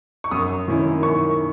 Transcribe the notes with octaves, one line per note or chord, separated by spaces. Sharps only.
C#6
F#2 D#6
D#3 A#3 C#4 E4
F#2 C#6